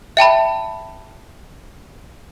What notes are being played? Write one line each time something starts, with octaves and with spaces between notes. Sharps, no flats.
E5 G5 A5 B5